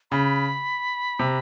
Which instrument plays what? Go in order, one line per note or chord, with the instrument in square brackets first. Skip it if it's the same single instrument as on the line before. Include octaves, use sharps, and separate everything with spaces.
[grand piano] C#3 [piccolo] B5
[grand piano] C3